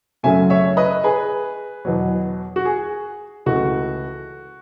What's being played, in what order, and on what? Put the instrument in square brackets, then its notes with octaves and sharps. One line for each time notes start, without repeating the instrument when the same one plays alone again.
[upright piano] F#2 C#3 F#3 A3 E5 G#5
C#5 E5
B4 D#5
G#4 B4
E2 B2 F#3
F#4
G#4
C#2 C#3 E3 A3 F#4